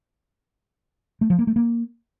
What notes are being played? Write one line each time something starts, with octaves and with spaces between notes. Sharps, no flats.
A3
F3
A#3
A3
A#3